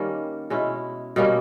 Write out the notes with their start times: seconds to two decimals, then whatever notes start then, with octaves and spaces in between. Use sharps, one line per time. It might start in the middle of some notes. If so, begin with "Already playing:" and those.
Already playing: D#3 G3 A#3 C#4
0.50 B2 G#3 C#4 E4
1.16 B2 G3 A#3 C#4